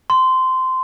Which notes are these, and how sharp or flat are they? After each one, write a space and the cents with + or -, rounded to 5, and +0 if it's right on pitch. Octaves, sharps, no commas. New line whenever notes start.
C6 -15